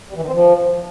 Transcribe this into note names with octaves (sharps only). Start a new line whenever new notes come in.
G3
E3
D#3
C4
F3